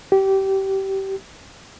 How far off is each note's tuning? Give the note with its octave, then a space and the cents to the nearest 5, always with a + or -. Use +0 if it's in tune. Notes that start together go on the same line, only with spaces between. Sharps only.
G4 -20